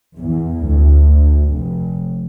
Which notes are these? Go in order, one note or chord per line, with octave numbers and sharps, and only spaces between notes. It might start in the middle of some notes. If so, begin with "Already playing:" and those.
E2
D2
F1